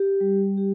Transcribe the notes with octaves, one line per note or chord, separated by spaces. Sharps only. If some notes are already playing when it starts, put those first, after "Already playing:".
Already playing: G4
G3
G4